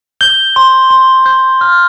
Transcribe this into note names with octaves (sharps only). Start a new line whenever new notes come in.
G6 G7
C6
C6
G6
F6